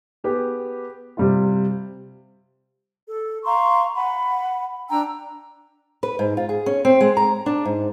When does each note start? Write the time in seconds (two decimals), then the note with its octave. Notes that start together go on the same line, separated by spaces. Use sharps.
0.24 B3 G4 G#4
1.17 C3 G3 F4
3.08 A4
3.45 F5 A#5 C6 C#6
3.95 F#5 B5
4.89 D4 G5 A#5 E6
6.03 B4
6.19 G#2
6.37 F4
6.49 G#4
6.66 C#4
6.85 C4
7.01 G#3
7.17 A#5
7.46 D4
7.65 G#2